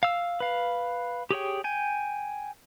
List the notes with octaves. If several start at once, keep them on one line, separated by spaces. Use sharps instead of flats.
F5 E6
B4 F5
G4 G#4 C#5 G5
G5 G#5